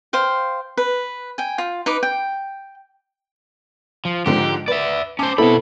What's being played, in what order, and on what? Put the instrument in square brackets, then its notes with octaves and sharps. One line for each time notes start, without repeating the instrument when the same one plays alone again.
[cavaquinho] C5 F5 G5
B4
G5 G#5
F4
D#4 B4 D6
G5
[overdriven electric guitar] F3
[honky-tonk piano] G#2 D3 F3 [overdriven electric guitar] G4
[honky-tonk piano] B4 [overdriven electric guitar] D5 E5
[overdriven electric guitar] C#4 C5 [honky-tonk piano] A5 D6
[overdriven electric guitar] B2 B5 [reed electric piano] B3 E4 A4 [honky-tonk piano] C4